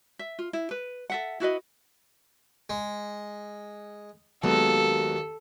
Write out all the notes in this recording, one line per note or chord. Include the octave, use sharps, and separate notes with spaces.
E5
F4
E4
B4
A4 E5 F#5
E4 F#4 B4 D#5
G#3
D#2 F#3 G#3 B3 A4